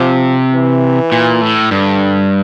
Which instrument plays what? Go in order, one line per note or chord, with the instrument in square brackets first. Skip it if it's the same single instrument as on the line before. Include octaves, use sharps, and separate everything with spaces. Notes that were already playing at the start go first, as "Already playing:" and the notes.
Already playing: [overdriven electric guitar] C3 [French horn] F3
[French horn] E3
[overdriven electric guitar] A#2
A2
[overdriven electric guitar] G2 [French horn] D3